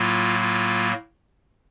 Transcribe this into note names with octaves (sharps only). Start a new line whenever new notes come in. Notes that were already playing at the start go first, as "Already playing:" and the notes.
Already playing: A2 F#3 A#3 F4
F4